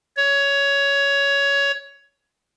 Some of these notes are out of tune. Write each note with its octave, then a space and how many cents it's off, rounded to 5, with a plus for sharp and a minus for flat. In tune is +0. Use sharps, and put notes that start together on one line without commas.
C#5 +15